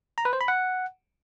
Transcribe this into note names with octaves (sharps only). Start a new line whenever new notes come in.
A#5
B4
C5
B5
F#5